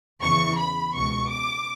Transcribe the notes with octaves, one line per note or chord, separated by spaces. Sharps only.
E2 C#3 E3 C#6
B5
C#2 B2 C#6
D6